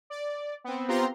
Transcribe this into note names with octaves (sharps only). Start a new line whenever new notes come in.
D5
B3 C4
B3 C4 F4 G4 A#5 C6